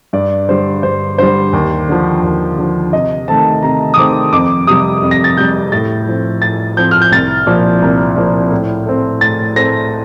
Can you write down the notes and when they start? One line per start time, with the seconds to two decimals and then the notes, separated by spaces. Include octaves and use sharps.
0.13 G2 D5
0.49 D3 G3 C5
0.83 G2 C5
1.18 D3 G3 C5
1.53 D#2
1.88 D3 F3
2.23 D#2
2.58 D3 F3
2.93 C3 D#5
3.28 D#3 A3 C4 A5
3.62 C3 A#5
3.94 D#6
3.97 D#3 A3 C4 D6
4.32 F2 D6
4.67 C3 G3 D#6
5.02 F2
5.11 A#6
5.24 A6
5.37 C3 G3 G6
5.72 A2 A6
6.07 F3 C4
6.42 A2 A6
6.77 F3 C4 G6
6.91 F6
7.02 G6
7.12 C2 A6
7.47 A#2 F3
7.82 C2
8.17 A#2 F3
8.52 A2
8.86 A3 C4
9.21 A2 A6
9.56 A3 C4 A#6